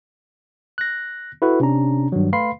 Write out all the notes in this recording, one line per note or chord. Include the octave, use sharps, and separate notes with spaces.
F#6 A#6
E4 F#4 A4 B4
C3 C#4 D4 A#5
G2 D#3 F#3
A3 B4 F5 B5 C6 C7